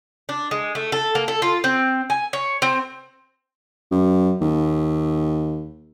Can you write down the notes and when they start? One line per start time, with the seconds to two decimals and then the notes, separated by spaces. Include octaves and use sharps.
0.29 D4
0.51 G#3
0.75 A3
0.92 A4
1.15 A#3
1.28 A4
1.42 F4
1.64 C4
2.10 G#5
2.33 C#5
2.62 C4
3.92 F#2
4.41 D#2